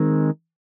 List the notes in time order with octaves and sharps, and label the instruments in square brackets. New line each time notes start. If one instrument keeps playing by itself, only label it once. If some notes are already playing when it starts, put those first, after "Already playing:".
Already playing: [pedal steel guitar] D#3 G#3 C4